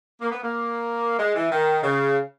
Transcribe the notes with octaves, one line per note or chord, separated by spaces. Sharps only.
A#3
B3
A#3
G#3
E3
D#3
C#3